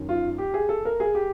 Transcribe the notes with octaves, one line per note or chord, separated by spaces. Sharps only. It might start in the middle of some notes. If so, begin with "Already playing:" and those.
Already playing: F#2 D#3
F4
G4
G#4
A4
A#4
G#4
G4